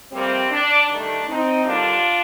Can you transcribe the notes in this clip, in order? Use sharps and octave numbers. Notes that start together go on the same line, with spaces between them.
F2 C3 G3 A#3 C4
D4
G2 D#3 A3 D4
C4 D#4
D#2 D3 G3 A#3 D4 F4